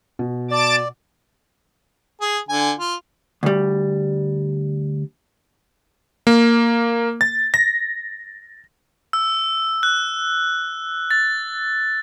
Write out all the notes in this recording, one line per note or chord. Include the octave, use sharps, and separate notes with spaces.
B2
D5 A5 D6 A6
G#4
D3 G#5
F4
D2 G3
A#3
A6
A#6
E6
F#6
A6